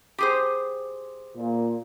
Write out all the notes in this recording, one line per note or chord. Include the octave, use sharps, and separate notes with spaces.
G4 G#4 C5
A#2